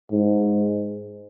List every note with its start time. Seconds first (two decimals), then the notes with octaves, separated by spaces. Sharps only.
0.12 G#2